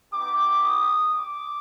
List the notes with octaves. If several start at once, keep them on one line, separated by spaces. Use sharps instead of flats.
B3 D#4 G4 D6
D#6
D6